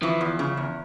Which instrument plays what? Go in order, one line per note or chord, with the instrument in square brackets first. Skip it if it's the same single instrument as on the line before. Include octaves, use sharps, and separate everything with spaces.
[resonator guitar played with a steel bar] E3 [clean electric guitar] F3
[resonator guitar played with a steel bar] E2
C#3
E2